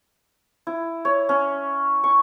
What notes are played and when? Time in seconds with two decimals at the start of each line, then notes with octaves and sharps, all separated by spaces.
0.67 E4
1.05 C#5
1.29 C#4
2.04 C#6